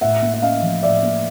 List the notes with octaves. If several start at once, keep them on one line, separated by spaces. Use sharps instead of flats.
A2 E5 F#5
A#3
E5
C#4 D#5 F5
F3
A2 D5 E5
A#3